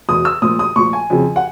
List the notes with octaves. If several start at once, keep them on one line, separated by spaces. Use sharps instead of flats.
E2 B2 D#6
E6
A#2 F3 D#6
D#6
A#2 F3 C#6
G#5
F2 C#3 F3
F#5